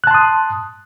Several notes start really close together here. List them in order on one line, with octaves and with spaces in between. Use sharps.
F#6 A5 C6 D#6